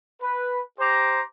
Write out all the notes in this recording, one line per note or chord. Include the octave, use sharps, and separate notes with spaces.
B4
G4 C5 A#5 D6